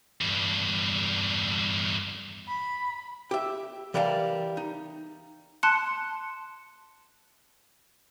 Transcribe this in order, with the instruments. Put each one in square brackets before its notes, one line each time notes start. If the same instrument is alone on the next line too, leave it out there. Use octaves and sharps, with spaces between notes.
[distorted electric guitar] E2 G2
[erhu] B5
[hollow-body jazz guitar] G4 E5
E3 G3 A#4 F5 G5 A5
D#4
[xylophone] A5 C6 F#6 C#7